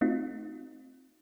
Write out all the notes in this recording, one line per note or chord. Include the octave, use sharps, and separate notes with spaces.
A3 C4 D#4 F4 F#4